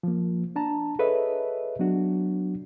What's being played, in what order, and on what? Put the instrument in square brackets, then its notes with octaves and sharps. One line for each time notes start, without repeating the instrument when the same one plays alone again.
[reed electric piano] F3 A#3
D4 A5 A#5
G#4 A4 B4 C#5 D#5 E5
F#3 B3 D4 F#4